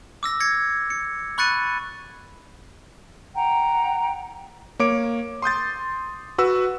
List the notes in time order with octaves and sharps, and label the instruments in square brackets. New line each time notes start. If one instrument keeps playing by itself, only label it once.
[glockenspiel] D6 E6 A#6
G#6 A#6 C#7
C#7
B5 C#6 F#6 A6 C#7 D#7
[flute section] F#5 G5 A#5
[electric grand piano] A#3 C#5 D6 D7
C6 D#6 G6 A6
F#4 B4 E6